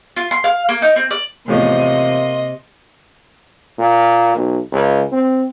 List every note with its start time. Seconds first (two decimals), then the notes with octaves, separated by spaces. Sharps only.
0.16 F4
0.31 C6
0.44 F5
0.69 A#3
0.82 D#4
0.96 C4
1.11 D5
1.48 E2 A2 C3 F3 A#3 D#5 C6
3.79 A#2
4.36 B1
4.72 C#2
5.12 C4